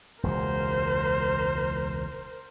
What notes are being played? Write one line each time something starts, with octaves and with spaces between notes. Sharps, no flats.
E1 C#2 A#2 A#4 C5